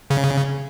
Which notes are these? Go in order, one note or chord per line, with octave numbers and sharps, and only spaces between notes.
C#3